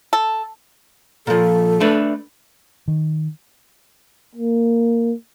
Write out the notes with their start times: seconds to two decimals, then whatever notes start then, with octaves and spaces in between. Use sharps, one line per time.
0.13 A4
1.27 A#2 F3 A4
1.80 A3 D4 B4
2.88 D#3
4.35 A#3